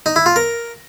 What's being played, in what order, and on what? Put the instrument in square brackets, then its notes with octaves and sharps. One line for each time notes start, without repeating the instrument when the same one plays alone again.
[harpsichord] D#4
E4
F4
A#4